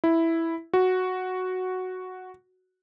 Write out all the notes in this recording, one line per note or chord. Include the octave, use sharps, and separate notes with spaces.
E4
F#4